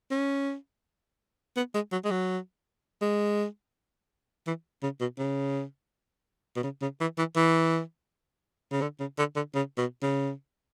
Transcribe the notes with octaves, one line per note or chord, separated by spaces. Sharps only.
C#4
B3
G#3
F#3
G#3
F#3
G#3
E3
C#3
B2
C#3
B2
C#3
C#3
E3
E3
E3
C#3
D3
C#3
D3
D3
C#3
B2
C#3